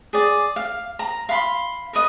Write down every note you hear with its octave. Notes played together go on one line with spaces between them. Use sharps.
G#4 D5
F5
A#5
F5 B5 C6
A#4 B4 D#5